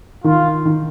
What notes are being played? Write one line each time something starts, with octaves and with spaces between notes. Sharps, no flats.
D#3 F4
D#3